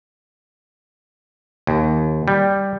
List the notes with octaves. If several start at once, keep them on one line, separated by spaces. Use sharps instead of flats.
D#2
G3